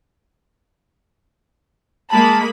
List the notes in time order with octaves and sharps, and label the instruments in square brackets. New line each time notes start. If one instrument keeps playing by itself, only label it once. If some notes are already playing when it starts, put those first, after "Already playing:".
[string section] G#3 A#3 B5 [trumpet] A5